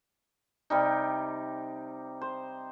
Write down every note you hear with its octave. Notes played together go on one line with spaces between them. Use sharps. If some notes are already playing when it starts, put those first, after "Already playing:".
C3 G3 D#4
C5